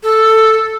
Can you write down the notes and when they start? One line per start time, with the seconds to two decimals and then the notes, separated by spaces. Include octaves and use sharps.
0.03 A4